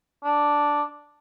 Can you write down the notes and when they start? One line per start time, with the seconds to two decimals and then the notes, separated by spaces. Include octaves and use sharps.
0.24 D4